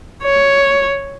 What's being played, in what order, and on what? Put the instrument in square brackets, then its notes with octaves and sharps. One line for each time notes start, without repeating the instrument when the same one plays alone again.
[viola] C#5